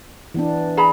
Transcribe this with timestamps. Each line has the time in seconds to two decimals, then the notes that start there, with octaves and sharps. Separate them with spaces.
0.34 E3 B3 D4
0.77 G#4 A#5 B5